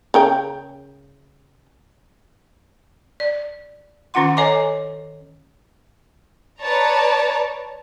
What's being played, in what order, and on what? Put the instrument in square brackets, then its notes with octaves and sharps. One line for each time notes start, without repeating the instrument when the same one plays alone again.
[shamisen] C#3 A#4 G5
[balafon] D5
D#3 C#4 F4 F#5 C6
A4 C#5 D#5 G#5 A#5 D6
[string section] B4 C#5 D5 A5 A#5